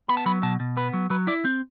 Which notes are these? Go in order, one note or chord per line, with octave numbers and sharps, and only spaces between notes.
B3 B5
A5
F#3 B5
B2 A5
B2
B3 B4
F#3
F#3 B4
E4 D5
C4